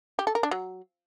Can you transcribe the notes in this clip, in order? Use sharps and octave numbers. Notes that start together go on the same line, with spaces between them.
G4
A4
A#4
D4
F#3